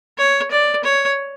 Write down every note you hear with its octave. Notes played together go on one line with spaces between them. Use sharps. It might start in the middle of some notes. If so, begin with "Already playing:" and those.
C#5
D5
C#5